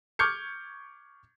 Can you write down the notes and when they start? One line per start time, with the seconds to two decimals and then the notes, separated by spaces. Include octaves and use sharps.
0.19 C#6 D6 F6 G6 G#6 C#7